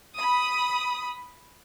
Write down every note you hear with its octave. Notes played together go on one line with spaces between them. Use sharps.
B5 D#6